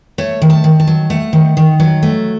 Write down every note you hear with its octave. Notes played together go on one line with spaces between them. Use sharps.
A3 C#5
D#3
A5
D#3
A5
F#3
A3 F#5
D#3
D#3
F#3
A3